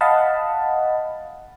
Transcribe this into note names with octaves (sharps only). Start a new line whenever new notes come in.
D#5 F5 F#5 A5 B5